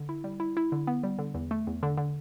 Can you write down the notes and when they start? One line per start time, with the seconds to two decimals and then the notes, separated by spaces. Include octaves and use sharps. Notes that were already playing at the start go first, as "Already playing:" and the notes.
Already playing: D3
0.09 E4
0.24 G3
0.40 E4
0.57 E4
0.72 D3
0.87 B3
1.03 G3
1.19 D3
1.34 E2
1.51 A3
1.67 E2
1.83 D3
1.98 D3